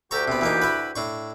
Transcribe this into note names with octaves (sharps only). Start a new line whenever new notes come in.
D2 F#4 G4 A4 A#5 C#6
C3 B3
E3 A#3 D#4
E4 B4
A2 D4 C#6